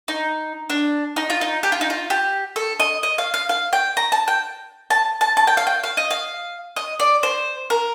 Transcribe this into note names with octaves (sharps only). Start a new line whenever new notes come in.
D#4
D4
D#4
F4
D#4
G4
F4
D#4
F4
G4
A4
D#5
D#5
F5
F5
F5
G5
A#5
A5
G5
A5
A5
A5
G5
F5
G5
F5
D#5
F5
D#5
D5
C5
A#4